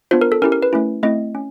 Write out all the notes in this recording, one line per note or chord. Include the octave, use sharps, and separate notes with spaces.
B3 D4 F4 C5
A#4
A4
C#4 E4 G4 A#4
A#4
B4
A3 C#4 E4
A3 C4 E4 D#5
C#4